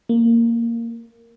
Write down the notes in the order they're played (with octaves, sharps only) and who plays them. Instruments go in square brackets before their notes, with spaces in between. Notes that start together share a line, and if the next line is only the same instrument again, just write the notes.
[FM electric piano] A#3